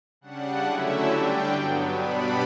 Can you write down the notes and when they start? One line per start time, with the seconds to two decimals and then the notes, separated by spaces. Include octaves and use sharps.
0.21 C#3 G3 D4 F#5
0.64 D3 F#3 A3 C#4 E4 E5
1.07 D3 G3 D4 G5
1.51 G2 F#3 B3
1.93 B2 G3 B3 D4 B5